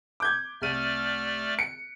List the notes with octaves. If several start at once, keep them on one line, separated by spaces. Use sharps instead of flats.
D6 G6 G#6
C2 A3 D5 F6 D#7
C#7 D7